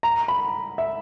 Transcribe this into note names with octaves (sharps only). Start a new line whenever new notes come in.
A#5
B5
E5